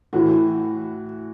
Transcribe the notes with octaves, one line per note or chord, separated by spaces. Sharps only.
A2 E3 F#4